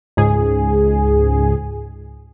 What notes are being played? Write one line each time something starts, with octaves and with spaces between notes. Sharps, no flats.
C#2 G#2 G#4